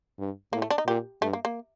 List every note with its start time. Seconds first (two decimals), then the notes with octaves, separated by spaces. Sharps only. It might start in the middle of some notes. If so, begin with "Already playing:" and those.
0.19 G2
0.53 A2 A#3
0.62 A3
0.70 D4
0.78 D#4
0.87 A#2 G4
1.22 G2 A3
1.33 A#3
1.45 A#3